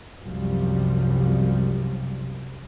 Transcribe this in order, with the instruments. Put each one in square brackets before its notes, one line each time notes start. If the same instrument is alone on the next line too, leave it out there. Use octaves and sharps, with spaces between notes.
[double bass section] C2 F#2 C3 F3 G3